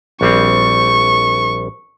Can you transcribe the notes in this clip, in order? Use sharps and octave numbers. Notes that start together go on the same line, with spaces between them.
A#1 G3 C4 C#6